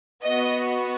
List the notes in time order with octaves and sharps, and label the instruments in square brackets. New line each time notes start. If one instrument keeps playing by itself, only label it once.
[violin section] B3 F#4 D#5